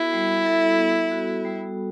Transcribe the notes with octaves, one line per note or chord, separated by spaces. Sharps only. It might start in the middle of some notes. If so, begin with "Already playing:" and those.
Already playing: B3 E4 F#4 A4
G3
A4
B3
F#4
G3